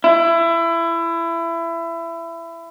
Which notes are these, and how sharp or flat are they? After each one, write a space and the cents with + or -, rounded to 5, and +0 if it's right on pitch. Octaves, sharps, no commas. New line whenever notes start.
E4 +25